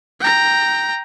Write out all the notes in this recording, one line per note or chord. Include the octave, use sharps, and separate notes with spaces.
G5 A#5